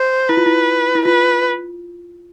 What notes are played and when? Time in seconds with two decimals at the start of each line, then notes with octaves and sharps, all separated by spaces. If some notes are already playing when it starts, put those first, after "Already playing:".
Already playing: C5
0.29 E4 B4
0.37 F4
0.46 E4
0.95 E4
1.05 F4 B4